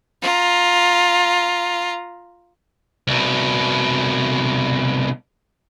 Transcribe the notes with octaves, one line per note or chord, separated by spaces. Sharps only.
F4 A#5
C2 B2